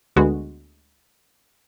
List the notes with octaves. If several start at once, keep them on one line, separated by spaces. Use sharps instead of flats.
D2 D3 G#3 B3 F#4